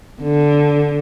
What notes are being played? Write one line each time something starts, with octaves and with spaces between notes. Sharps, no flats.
D3